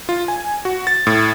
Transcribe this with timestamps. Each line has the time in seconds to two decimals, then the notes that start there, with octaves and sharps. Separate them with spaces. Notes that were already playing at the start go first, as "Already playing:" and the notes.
0.09 F4
0.28 G#5
0.65 F#4
0.87 A6
1.07 A2